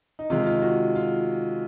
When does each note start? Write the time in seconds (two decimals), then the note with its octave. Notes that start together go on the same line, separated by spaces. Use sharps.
0.19 D#4
0.30 C3 D#3 G#3 F4
0.46 F4
0.62 F#4
0.95 F4